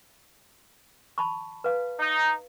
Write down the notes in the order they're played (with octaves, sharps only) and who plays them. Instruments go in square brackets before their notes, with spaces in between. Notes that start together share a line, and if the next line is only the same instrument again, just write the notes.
[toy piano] A5 B5 C#6
B4 F5
[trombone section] D#4